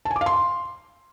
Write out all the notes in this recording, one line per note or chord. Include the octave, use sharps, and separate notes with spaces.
A5
G#5
D6
F5
C6